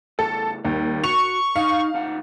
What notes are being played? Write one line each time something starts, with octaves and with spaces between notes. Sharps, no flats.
A2 C#3 A4
D#2 G3
F#4 C#6 F7
D#4 F5
D2 D#4 F#5